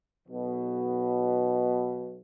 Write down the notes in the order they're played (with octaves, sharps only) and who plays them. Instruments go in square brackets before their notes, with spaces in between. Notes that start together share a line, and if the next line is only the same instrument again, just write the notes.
[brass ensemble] B1 B2